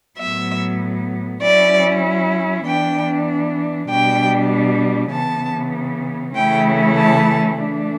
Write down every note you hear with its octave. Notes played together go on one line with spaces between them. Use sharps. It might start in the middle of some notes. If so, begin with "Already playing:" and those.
A2 F#3 B3 E5
F#3 C#4 E4 D5
E3 B3 D4 G5
B2 G3 D4 G5
C#3 E3 B3 A5
C#3 E3 A3 C#4 E4 G5
A5
E3 A3 D4